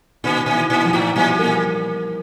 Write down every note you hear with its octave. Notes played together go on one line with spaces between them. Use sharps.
A#2 D#3
A#2
E3
A#2
F3
A2
A#2 G3
A#3